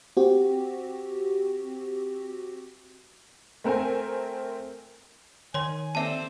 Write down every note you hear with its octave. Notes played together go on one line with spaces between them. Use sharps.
C4 F#4 G4
A3 C4 A#4 C5 G#5
D#3 C#5 G#5 C6
C4 A4 C5 D5 E5 A5